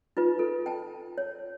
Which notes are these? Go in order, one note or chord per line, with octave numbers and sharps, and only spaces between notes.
D#4 F4 B4
A4
G5 A5
C#5